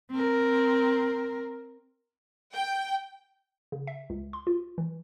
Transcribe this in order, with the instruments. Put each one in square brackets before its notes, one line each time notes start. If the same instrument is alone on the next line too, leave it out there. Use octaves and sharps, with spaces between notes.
[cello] C4 A#4
[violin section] G5
[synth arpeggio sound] C#3
E5
C#2
C6
F4
E3